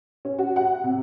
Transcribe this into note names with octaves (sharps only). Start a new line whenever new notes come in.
C#4
F#4
F#5
C3